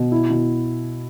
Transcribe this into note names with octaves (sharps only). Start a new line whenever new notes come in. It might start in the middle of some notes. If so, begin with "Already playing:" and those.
Already playing: B2
E4
B2